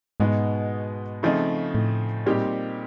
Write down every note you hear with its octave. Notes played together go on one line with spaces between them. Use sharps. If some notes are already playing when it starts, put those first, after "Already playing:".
G#2 B2 G#3 B3 D#4 F#4
C#3 F3 A3 C4 D#4
A2
A#2 G3 C4 D#4 G4